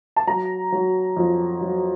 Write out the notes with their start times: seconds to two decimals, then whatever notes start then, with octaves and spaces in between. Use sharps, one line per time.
0.16 A5
0.27 F#3 A#5
0.72 F#3
1.17 F2
1.61 F#3